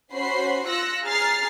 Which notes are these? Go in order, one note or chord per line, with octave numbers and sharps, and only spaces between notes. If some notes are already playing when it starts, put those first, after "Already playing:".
C#4 F#4 C5 B5 C7
F4 E6 F#6 A#6 C#7
G#4 A#5 F6 A6 C7